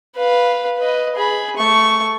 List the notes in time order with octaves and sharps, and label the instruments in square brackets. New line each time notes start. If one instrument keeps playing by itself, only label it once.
[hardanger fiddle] B4 F5
B4 D#5
G#4 B5
A3 C#6